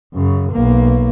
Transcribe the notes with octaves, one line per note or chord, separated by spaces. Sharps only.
F#2 C#3
B1 A#3